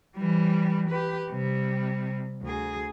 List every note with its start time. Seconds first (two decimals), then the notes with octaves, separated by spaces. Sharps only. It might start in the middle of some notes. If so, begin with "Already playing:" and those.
0.17 E3 G3
0.90 G4 B4
1.30 C3 G3
2.42 D2 G#4